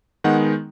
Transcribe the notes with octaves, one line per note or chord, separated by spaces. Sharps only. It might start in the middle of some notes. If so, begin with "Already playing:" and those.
D#3 G#3 B3 D#4 F#5